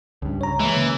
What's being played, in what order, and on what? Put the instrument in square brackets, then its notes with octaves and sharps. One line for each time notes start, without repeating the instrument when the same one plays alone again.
[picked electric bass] C#2 G2
[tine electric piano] C#5 A#5
[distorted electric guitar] E3 [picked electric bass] G#3 A#3
[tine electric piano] C#3